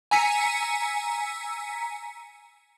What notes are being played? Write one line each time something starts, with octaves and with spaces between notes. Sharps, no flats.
G#5 A#5 E6 B6 C#7 D#7